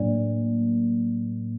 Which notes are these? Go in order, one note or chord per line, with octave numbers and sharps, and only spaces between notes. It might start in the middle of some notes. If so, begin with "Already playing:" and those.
Already playing: A2 F#3 A#3 D4 D5